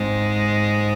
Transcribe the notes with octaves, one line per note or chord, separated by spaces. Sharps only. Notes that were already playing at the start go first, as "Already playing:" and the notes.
Already playing: G#2 G#3 C4